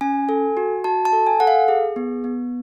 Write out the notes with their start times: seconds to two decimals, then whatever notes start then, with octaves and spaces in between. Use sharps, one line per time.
0.01 C#4 G#5
0.29 A4
0.57 F#4
0.84 F#4 A5
1.05 A5
1.13 A4
1.27 G#5
1.40 A4 F#5
1.47 F5
1.68 G#4
1.96 B3
2.24 B3